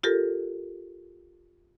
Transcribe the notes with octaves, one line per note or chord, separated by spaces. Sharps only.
F4 G4 A4 A#4